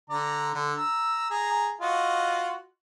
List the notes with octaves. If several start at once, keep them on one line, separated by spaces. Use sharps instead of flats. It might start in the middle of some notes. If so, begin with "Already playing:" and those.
D3 D5 A#5
D3
A#5 E6
G#4 A#5
F4 F#4 D#5